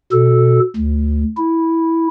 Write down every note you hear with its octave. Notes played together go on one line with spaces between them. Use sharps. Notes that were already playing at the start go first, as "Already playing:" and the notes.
B2 A4
D2
E4